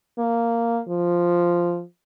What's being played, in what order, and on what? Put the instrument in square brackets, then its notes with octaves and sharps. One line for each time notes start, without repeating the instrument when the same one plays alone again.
[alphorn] A#3
F3